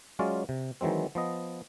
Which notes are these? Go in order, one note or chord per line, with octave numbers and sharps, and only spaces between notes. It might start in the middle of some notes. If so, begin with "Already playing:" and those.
F#3 G#3 C#4 F4 D5
C3
D#3 E3 F#3 G#3 C4
F3 B3 D#5